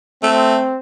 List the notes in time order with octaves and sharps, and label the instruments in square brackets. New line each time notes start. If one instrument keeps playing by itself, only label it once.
[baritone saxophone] A3 [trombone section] C4